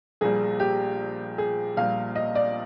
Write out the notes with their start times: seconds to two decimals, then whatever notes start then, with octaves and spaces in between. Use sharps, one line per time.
0.21 A#1 A#2 G3 G#4
0.60 G4
1.38 G#4
1.77 A#1 A#2 G3 F5
2.16 D#5
2.35 D5